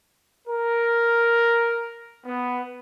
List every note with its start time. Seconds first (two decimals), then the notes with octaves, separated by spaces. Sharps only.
0.47 A#4
2.25 B3